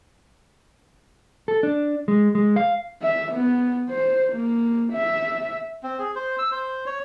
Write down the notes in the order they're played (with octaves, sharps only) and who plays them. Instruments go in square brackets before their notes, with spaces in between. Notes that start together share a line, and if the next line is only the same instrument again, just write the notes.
[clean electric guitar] A4
D4
G#3
G#3
F5
[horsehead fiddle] E5
B3
C5
A#3
E5
[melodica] C4
G#4
C5
E6
C5
C#5